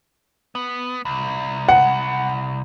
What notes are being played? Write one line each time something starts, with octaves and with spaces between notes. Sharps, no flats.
B3
C2
F#5